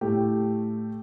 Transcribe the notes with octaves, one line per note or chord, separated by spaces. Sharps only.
A2 A3 G4